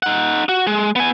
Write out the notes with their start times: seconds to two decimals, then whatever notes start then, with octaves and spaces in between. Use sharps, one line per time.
0.03 D#4 F#5
0.49 F#4
0.67 G#3
0.96 B3 G#5